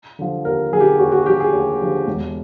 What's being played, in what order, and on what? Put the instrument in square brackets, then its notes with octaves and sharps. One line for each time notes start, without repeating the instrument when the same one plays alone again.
[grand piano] D3 F3
D#2 A#4
D3 F3 G#4
G4
D#2 F#4
F#4
D3 F3 G4
G#4
D#2
D3 F3
E1